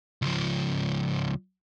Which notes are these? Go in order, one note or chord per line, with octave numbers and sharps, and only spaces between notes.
C#2 F3